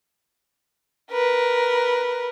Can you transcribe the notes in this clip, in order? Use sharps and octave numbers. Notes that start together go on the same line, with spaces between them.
A#4 B4